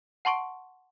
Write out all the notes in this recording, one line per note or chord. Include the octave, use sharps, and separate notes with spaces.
F#5 A5 C6 C#6 D7